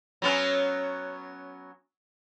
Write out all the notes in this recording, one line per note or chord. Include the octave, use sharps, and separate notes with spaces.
F#3 B3 C#4